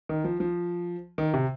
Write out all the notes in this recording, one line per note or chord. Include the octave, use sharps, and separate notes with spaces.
D#3
F3
F3
D#3
C3